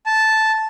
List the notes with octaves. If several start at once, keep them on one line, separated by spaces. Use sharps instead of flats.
A5